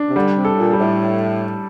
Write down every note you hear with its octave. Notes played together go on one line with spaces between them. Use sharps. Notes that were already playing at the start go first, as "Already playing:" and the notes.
Already playing: D4
C3
D3 G3
C3
A4
A2
A#2
G3
A2